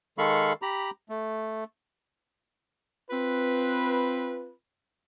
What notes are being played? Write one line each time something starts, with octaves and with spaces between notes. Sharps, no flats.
D#3 G#3 A4 F5 B5 C#6
G4 A#5 B5
A3
C4 F4 B4